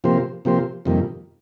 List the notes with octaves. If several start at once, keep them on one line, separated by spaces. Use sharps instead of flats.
C3 F3 A#3 G4 C5
C3 F3 A#3 G4 C5
F2 C3 D#3 G3 A#3